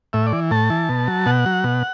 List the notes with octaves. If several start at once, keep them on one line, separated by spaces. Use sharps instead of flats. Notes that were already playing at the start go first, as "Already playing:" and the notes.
A2 E5
D5
E3
A2 A5
E3
B2
F#3
B2 F#5
F#3
B2